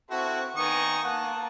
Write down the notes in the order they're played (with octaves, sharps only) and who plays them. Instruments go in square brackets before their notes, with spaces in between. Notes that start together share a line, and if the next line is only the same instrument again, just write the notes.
[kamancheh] C4 C#6 [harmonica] E4 F#4 A4
[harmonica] D#3 C#6 D#6 [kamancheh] B3 G#5
[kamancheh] A#3 A5 [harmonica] F#5